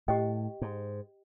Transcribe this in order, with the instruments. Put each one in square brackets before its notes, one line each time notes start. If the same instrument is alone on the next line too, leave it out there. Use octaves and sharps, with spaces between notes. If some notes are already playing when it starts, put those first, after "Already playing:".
[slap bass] A2 [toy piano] G4 C5 D#5 G5
[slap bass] G#2